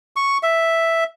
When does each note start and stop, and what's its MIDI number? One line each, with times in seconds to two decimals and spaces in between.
0.16 0.38 85
0.43 1.04 76